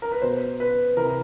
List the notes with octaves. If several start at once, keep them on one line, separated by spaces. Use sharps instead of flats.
A#4
B4
B2 C5
B4
C3 E3 A#4